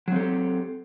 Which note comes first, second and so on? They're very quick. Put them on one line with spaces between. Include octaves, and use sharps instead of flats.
F#3 C4 A4 G4